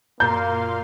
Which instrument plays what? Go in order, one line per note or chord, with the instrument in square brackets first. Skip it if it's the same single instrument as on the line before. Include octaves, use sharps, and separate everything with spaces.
[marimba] F#2 A#5 [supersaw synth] A#2 F5 C6 [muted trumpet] A#3 [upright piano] G6